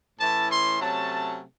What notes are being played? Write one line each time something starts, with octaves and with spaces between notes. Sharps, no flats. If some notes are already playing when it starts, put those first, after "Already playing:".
A2 E3 A3 C#4 E4 A5
C6
C3 F#3 A3 C#4 A5